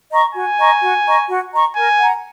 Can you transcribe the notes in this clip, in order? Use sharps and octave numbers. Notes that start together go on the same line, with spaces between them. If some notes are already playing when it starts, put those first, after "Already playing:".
D#5 A#5 C#6
F#4 G#5
D#5 A#5 C#6
F#4
D#5 A#5 C#6
F#4
D#5 A#5 C#6
A#4 G#5
F#5 A#5